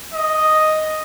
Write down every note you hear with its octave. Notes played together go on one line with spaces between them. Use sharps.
D#5